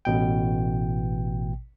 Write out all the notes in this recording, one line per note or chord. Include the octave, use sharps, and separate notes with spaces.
A1 B2 G5